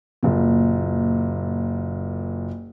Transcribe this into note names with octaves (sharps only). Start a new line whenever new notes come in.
F#1 A#2